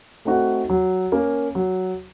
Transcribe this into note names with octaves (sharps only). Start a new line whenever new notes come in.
A3 C4 D#4 F#4
F#3
A#3 C#4
F#3